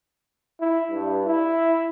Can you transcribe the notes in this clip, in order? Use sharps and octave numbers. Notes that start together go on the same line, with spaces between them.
E4
G2
E4